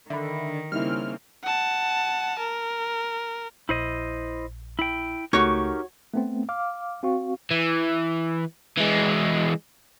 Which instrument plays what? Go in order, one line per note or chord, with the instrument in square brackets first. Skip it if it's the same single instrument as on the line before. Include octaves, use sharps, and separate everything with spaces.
[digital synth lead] D3 [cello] D#3 [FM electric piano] E5 B5
[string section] C#3 A#3 C4 [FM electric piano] G3 D#4 E4 [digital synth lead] F6
[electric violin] F#5 A5
A#4
[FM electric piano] A#1 [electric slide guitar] E4 C5 D#5
[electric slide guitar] E4 G5
[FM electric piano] C#2 A3 [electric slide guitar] D#4 G4 A#4 [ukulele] F#4 C#5
[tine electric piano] A3 B3 C4
F5 D6 F6
C4 F#4 F5 C#6
[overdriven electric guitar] E3
E3 G#3